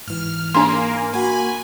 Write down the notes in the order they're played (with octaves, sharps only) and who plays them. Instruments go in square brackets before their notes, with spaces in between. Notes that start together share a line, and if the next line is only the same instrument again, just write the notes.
[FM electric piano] G#2 E3 [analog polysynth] F6
[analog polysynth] A#3 [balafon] D4 C6 [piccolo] G#5
[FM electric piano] A#3 F#4 [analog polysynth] G#5 [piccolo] B5